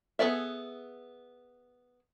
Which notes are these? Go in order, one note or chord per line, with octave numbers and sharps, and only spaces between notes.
B3 G#4 A4 D5 E5